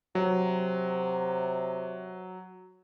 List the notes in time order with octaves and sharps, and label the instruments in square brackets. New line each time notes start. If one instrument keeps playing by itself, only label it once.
[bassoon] C3 [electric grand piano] F#3